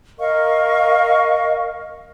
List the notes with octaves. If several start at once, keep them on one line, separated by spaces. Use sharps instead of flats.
A#4 D#5 F5 C#6